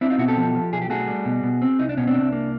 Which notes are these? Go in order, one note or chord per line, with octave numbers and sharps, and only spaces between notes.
C4 D4 E4
D#4 F4
B2 E4 F#4
G4 A4
F3
F3
B1 G#4
G4
A3 F#4 G#4
G3
B2
B2
C4
C2 D#4
D4
B2 C#4
C4 D4
C2
A#3